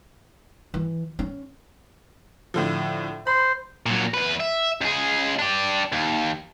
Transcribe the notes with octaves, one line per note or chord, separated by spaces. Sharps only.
E3
C#4
A2 D3 F3
C5 B5
A#2 F#3
E2 B4
E5
C#2 G#4
D4 G4
D#2